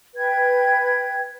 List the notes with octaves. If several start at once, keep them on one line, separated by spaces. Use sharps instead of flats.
B4 G5 G#6